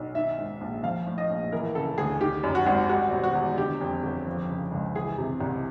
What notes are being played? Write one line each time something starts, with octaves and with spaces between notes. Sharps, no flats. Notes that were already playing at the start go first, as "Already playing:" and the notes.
Already playing: B1
D#3 E5
G#2
A#1
F3 F5
A2
D#5
A#1
E3 A#4
C#3 A4
D2 G#4
D#3 G4
F#2
F#4
G#1
G3 F#4
B2
F#4
E2
D3 G4
F2
G1
F3
C#3
C#2
E3 G#4
C3
C2